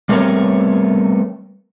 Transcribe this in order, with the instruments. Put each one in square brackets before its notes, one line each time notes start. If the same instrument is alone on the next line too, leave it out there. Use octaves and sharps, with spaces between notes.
[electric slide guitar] G3 A3 B3 C4 A#4 C#5